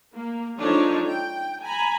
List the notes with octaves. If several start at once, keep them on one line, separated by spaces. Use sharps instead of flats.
A#3
F3 G#3 D4 D#4 A4 C#5
G5
G#5 A#5 B5